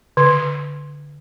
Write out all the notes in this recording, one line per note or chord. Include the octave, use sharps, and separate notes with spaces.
D3